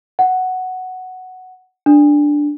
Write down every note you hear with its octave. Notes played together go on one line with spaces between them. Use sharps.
F#5
D4